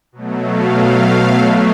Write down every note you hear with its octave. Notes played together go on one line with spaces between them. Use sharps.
B2 F#3 A3
F5
B2 F#3 A3